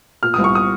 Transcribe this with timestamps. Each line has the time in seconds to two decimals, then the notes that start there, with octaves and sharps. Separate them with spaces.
0.23 A#2 F6
0.34 C2 D#6
0.44 C#6
0.55 D#6